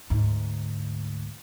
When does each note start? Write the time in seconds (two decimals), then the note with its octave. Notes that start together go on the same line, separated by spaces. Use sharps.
0.10 D2 G#2